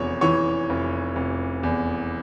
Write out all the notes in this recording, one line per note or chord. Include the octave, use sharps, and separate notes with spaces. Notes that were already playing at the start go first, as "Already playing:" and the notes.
Already playing: F1 E2 C#5 C#6
E3 C#5 C#6
F1
F1
E2